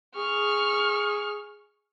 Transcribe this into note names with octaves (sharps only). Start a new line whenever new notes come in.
G#4 C#6 F6